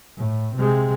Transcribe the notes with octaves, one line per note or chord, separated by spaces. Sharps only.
A2
C3 G#3